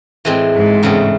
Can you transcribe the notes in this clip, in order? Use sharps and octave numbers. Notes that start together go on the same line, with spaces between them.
A2 E3 G#3 C4
G#2
E2 C#3 E3 A3 C4